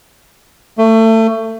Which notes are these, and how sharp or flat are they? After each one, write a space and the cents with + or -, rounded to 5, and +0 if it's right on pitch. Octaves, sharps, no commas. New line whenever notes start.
A3 +25